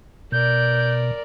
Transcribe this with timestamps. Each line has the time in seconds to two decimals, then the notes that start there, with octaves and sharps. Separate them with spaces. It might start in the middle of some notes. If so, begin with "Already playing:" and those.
0.32 B2 A#4 D5 G6